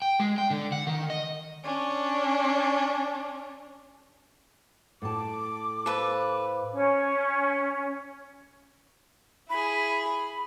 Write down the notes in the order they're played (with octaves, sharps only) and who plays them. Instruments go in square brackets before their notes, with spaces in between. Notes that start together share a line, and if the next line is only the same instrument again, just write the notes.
[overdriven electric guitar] G5
G#3
G5
D3
F#5
D#3
D#5
[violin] C#4 D4
[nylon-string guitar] A2 A5 [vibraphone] A4 [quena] D6
[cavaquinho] A4 B4 [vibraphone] C5 F5 B5
[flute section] C#4
[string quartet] E4 G#4 [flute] B5